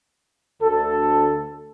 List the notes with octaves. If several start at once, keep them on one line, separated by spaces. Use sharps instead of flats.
D2 A4